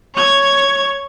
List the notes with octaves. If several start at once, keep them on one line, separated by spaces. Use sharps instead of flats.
C#5 G#6